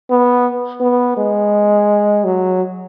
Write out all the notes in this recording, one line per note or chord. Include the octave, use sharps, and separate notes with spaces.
B3
B3
G#3
F#3